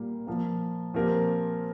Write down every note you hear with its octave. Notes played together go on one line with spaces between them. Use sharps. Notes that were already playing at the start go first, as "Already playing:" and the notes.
Already playing: A#2 G3 A#3
A#2 F3 A#3
A#2 F3 C4 G4 A#4